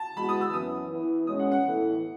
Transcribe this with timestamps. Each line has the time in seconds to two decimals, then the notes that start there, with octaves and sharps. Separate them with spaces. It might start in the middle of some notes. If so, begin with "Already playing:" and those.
Already playing: A5
0.17 E3 G#3 B3 F#4 B5
0.29 D#6
0.41 E6
0.53 F#2 E3 B3 D#6
0.91 E3 B3 E4 B4
1.27 B2 G#3 C#4 D#6
1.39 F#5
1.52 F#5
1.64 A2 E3 B3 E4 A4